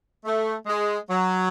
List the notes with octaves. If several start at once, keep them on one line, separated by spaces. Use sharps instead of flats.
A3
G#3
F#3